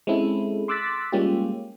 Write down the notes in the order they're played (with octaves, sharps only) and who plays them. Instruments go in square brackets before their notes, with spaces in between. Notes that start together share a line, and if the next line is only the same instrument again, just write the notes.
[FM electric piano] G#3 C4 C#4 E4 A4
C6 D6 E6 F#6 A6 B6
G3 G#3 A#3 C#4 F4 G4